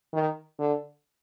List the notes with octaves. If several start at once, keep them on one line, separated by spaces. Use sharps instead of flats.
D#3
D3